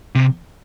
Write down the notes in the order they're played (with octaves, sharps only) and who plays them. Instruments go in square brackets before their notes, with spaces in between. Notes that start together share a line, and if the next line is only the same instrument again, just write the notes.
[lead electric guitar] C3